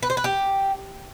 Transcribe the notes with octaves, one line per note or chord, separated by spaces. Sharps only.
B4
C5
B4
G4